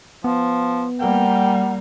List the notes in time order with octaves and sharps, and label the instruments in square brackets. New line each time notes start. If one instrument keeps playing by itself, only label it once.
[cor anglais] F3 [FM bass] B3
[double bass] G3 A#3 [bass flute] F#5 [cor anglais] G5